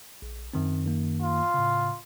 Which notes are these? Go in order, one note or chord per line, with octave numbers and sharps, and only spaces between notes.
A#1
F#2 D#3 C4
F#2 D#3 A#3
F4
A2 C#3